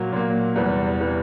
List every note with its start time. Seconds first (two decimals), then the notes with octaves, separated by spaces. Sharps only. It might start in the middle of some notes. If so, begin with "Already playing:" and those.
Already playing: A#2 F#3 A#3
0.13 A#2 F#3 A#3
0.56 E2 C3 E3 G3
1.00 C3 E3 G3